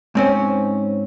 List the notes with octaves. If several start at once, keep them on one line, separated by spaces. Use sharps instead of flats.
G#2 C4 C#4